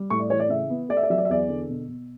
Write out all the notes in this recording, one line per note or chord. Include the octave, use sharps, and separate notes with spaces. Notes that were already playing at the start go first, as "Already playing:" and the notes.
Already playing: G3
A2 C#6
D5
E3 C#5
D5
C#3 E5
B3
A3 D5
E5
D5
F#3 E5
D5
E5
E2 D5
D3
B2
B2